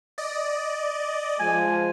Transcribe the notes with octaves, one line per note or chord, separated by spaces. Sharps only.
D5 D#5
F3 G#3 G#5